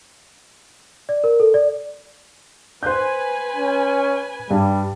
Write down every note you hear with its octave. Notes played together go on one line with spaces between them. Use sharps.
D5
A#4
A4
D5
B4 C5 G#5 F#6 G6
C#4
G2 G3